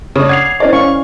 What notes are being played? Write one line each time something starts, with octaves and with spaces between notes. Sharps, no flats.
C#3 D4 C#5 D#6
F#5 D6 D#6 G#6 C7 F7
C#4 E4 A#4 C5 D5 D#5
C#4 D5 F5 C#6